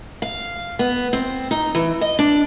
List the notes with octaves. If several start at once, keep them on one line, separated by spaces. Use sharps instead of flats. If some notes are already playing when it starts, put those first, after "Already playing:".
F5
B3
C4
D#4
E3
D#5
D4